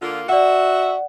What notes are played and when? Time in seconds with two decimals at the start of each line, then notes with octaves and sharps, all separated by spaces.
0.02 D3 A#3 F4
0.29 F#4 D5 E5 F#5